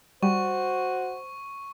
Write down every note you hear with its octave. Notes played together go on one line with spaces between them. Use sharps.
G3 F#4 C5 C#6